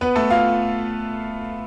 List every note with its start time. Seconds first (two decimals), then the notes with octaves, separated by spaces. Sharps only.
0.01 B3 B4
0.16 A3 A4
0.30 F4 F5